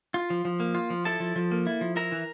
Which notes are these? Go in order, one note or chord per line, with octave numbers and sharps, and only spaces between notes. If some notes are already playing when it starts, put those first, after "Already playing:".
F4
F3
F3
A#3
F4
F3
E4 A4 A5
F3
F3
A#3
E4
F3
E4 A#4 A#5
E3